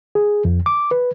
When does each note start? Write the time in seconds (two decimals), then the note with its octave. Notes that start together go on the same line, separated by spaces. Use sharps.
0.15 G#4
0.45 F2
0.66 D6
0.91 B4